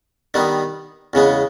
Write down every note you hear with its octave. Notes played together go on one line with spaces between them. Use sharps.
D#3 G3 B3 D#4
E2 C#3 G#3 B3